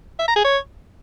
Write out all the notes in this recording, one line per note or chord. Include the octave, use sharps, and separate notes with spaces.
E5
A#5
G#4
C#5